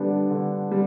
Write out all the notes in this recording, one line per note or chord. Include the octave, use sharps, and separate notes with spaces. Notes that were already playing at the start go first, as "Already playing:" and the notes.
Already playing: D3 G3 B3 D4
D3
G3